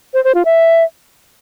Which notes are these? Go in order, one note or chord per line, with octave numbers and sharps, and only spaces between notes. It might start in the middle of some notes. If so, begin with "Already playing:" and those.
C5
C5
F4
E5